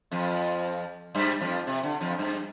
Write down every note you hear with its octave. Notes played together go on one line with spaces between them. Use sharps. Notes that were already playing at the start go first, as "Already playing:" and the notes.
F2 F3
G2 G3
F2 F3
C3
D3
F2 F3
G2